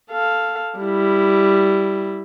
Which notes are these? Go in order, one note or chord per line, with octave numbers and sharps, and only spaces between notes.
A4 F5
G3 E4